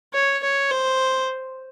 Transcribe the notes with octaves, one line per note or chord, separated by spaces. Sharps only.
C#5
C#5
C5